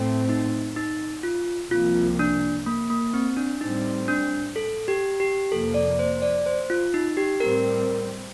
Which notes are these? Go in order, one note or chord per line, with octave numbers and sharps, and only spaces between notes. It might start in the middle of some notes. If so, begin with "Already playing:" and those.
Already playing: A2 A3 C4
D#4
D#4
F4
C2 C3 F3 A#3 F4
D4
A#3
A#3
C4
D4
A2 G3 C4 D#4
D4
A4
G4
G4
F2 C3 F3 A#3 A4
D5
C5
D5
C5
F4
D#4
G4
A2 G3 C4 A#4